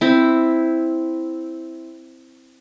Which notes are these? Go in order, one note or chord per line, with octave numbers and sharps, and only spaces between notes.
C4 E4